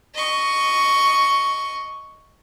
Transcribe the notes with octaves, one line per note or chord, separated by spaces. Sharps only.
D#5 C#6